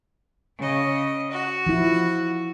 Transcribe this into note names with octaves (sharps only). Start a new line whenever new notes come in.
C#3 D#5
F#4
F3 E4